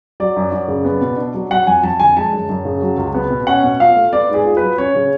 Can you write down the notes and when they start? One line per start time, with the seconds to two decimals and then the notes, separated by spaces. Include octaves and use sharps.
0.20 F#3 D5
0.36 F#2
0.52 F#2
0.68 C#3
0.85 B3
1.01 B2
1.17 D4
1.34 F#3
1.50 F#3 F#5
1.67 F2 G#5
1.83 F2 A5
2.00 D3 G#5
2.17 G#3 A5
2.33 F#2
2.49 F#2
2.65 C#3
2.82 F#3
2.97 C#2
3.14 B3
3.31 B2
3.47 C#4 F#5
3.63 B2
3.80 F4 F5
3.96 A3
4.12 B3 D5
4.29 G#2 G#4
4.45 F4
4.57 F#3 B4
4.78 C#4 C#5
4.95 C#3